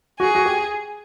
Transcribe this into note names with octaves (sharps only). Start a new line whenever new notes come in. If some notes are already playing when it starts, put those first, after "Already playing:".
F#4 G#4
F#4
G4